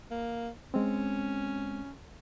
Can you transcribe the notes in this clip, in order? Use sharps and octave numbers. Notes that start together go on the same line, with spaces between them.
A#3
G#3 C4 C#4